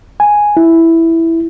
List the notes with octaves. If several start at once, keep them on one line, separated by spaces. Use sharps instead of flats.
G#5
E4